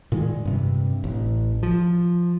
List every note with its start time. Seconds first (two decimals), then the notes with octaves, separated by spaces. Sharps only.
0.12 A#2 D#3 G#3
0.45 G2 C3
1.04 A1
1.63 F3